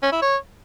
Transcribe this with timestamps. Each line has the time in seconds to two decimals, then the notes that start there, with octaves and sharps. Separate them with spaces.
0.03 C#4
0.12 E4
0.22 C#5